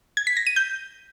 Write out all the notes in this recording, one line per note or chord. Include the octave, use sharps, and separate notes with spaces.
G#6
B6
A#6
D#7
G6